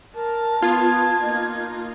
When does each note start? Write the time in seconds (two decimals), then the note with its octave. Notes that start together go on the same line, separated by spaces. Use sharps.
0.15 A#4 A5
0.62 B3 F4 G#6
1.22 A#3 D#4